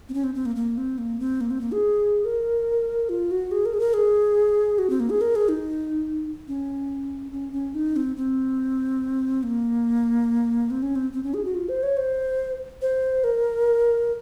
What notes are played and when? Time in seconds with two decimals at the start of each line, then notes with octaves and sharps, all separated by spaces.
0.09 C4
0.14 C#4
0.24 C4
0.35 C4
0.46 A#3
0.56 A#3
0.77 C4
0.98 A#3
1.20 C4
1.41 A#3
1.50 C4
1.61 A#3
1.72 G#4
2.25 A#4
3.09 F4
3.31 F#4
3.51 G#4
3.66 A#4
3.74 G#4
3.80 A#4
3.94 G#4
4.79 F#4
4.90 C4
5.00 A#3
5.10 G#4
5.21 A#4
5.36 G#4
5.49 D#4
6.48 C#4
7.32 C#4
7.53 C#4
7.75 D#4
7.96 C4
8.17 C4
9.43 A#3
10.70 C4
10.83 C#4
10.95 C4
11.13 C4
11.23 C#4
11.34 G#4
11.45 F#4
11.55 F4
11.69 C5
11.83 C#5
11.97 C5
12.82 C5
13.24 A#4